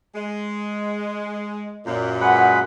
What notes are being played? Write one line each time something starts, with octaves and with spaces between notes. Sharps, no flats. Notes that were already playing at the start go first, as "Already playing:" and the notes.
G#3
F#2 A#2
G#3 B4 F#5 B5